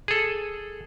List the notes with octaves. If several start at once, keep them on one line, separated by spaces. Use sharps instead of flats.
G#4 A4